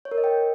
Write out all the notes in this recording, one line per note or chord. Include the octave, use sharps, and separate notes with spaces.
C#5
A#4
D#5
G5